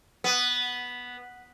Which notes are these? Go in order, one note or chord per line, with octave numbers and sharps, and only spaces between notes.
B3